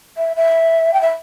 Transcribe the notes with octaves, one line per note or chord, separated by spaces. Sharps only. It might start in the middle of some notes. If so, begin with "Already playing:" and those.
E5
E5
G5
E5